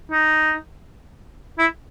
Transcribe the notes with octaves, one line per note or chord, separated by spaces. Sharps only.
D#4
E4